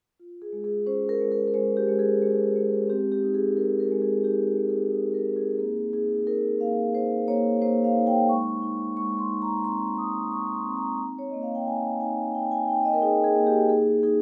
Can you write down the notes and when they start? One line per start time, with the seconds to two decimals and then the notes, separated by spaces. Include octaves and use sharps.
0.20 F4
0.42 G#4
0.53 G#3
0.64 G#4
0.86 C#4 C5
1.09 A#4
1.21 G#3
1.32 A#4
1.48 A#4
1.54 G#3 C5
1.77 G4
1.88 G#3
1.99 G#4
2.22 G#3
2.56 G#3
2.89 C4 G4
3.12 G4
3.23 D#4
3.34 G#4
3.57 D#4 A#4
3.80 A#4
3.91 G#3
4.02 G#4
4.24 D#4 G4
4.58 G#3
4.69 G#4
4.91 D#4
5.14 A#4
5.26 C4
5.36 G#4
5.59 A#3 G#4
5.93 D#4 G#4
6.27 D#4 A#4
6.60 A#3 F5
6.94 D#4 C5
7.28 A#3 C#5
7.62 A#3 C5
7.84 F5
7.96 D#4
8.07 G5
8.29 G#3 C#6
8.63 D#4
8.97 G#3 C#6
9.19 C6
9.31 D#4
9.42 A#5
9.64 C4 C6
9.98 G#3 D#6
10.32 D#4 C#6
10.54 C6
10.66 C4 C6
10.77 A#5
10.99 D#4
11.18 C#5
11.30 A#3 D#5
11.42 F5
11.55 G5
11.67 D#4 G#5
12.01 D#4 G#5
12.34 D#4 G5
12.51 G#5
12.68 D#4 G5
12.85 D#5
12.93 A#4
13.02 D#4 G#4
13.24 G#4
13.35 A#3
13.47 G4
13.69 D#4 G#4
14.03 D#4 G#4